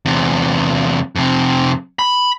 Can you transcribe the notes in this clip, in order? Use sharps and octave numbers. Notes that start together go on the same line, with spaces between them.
E2 C3
F2 C3
B5